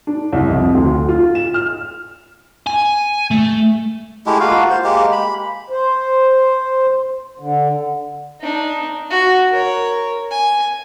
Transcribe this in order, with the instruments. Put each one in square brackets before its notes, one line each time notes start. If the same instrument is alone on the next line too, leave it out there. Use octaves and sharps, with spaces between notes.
[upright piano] D4
C2
F2
D2
F4
E7
F6
[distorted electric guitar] G#5
A3
[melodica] G#3 A3 E4 G4
A#3 F4 F#4 F5
C5
G#3 A#3 G4
B5
[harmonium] C5
D3
[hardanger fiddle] D4 D#4
F#4
A#4 C#5
G#5